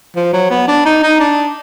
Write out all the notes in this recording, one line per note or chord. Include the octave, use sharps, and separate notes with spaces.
F3
F#3
B3
D4
D#4
D#4
D4